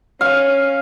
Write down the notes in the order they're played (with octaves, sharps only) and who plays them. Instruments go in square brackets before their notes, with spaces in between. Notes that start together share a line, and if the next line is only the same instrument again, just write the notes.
[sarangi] C#4 [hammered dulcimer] F5